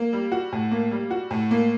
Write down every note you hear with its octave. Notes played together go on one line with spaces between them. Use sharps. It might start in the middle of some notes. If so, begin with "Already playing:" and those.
Already playing: A#3
G3
F#4
A2
A#3
G3
F#4
A2
A#3